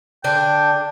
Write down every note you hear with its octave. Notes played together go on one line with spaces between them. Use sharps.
D3 D4 G5